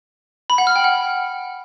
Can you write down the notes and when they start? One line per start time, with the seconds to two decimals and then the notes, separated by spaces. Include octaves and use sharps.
0.50 B5
0.58 F#5
0.67 F6
0.76 G5
0.84 F#5